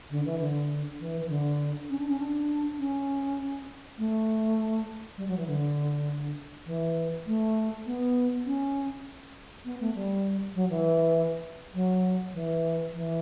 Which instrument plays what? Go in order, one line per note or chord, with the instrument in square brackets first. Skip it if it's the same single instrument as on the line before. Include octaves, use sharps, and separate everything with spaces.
[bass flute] D3
E3
D3
E3
E3
D3
C#4
D4
C#4
D4
C#4
A3
G3
F#3
E3
D3
E3
A3
B3
C#4
B3
A3
G3
F#3
E3
F#3
E3
E3